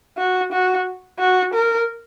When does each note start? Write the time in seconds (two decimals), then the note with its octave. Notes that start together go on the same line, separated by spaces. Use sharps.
0.18 F#4
0.53 F#4
1.19 F#4
1.54 A#4